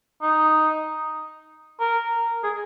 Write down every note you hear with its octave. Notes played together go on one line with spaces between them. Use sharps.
D#4
A#4
G#4